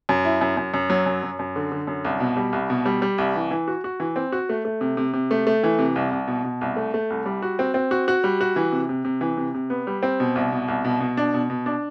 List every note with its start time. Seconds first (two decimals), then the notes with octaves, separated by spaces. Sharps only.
0.09 F#2
0.25 E4
0.41 F#2
0.57 F#2
0.74 F#2
0.90 F#3
1.06 F#2
1.23 F#2
1.39 F#2
1.56 D3
1.72 D3
1.87 F#2
2.05 C2
2.20 B2
2.37 G3
2.53 C2
2.70 B2
2.85 G3
3.02 G3
3.18 C2
3.35 E3
3.51 E3
3.68 F#4
3.84 F#4
4.00 E3
4.16 C4
4.32 F#4
4.49 A3
4.65 A3
4.81 C3
4.97 C3
5.13 C3
5.31 A3
5.47 A3
5.63 E3
5.79 C3
5.96 C2
6.11 C2
6.27 B2
6.44 B2
6.61 C2
6.76 A3
6.94 A3
7.10 C2
7.26 G3
7.42 F#4
7.59 C4
7.74 C4
7.91 F#4
8.08 F#4
8.24 G3
8.41 F#4
8.56 E3
8.72 C3
8.89 C3
9.05 C3
9.21 E3
9.37 C3
9.54 C3
9.70 B3
9.87 G3
10.03 C4
10.20 B2
10.36 C2
10.52 B2
10.68 C2
10.85 B2
11.00 B2
11.17 D4
11.34 B2
11.50 B2
11.66 D4